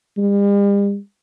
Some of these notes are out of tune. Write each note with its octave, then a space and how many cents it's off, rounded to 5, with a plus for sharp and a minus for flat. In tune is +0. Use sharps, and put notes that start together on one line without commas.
G3 +45